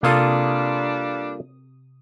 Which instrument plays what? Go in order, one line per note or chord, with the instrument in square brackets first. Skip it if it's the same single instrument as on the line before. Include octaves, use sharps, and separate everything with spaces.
[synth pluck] C3 D#6 [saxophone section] G3 D4 [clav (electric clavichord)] A#3 F4 A4